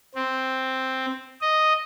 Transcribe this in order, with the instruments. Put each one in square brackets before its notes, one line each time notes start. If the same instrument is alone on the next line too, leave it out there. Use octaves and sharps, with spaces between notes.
[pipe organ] C4
D#5